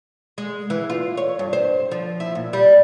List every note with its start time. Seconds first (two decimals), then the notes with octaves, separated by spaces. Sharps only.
0.38 G#3
0.70 E3
0.90 F4
1.17 C#5
1.39 G2
1.53 C5
1.91 F3
2.20 E4
2.35 A#2
2.53 G3